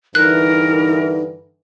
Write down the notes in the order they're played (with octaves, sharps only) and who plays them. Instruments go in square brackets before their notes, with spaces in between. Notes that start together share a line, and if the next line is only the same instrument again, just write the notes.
[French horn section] G2 D3 E3 [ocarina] D#4 [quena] A#4 [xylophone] F#6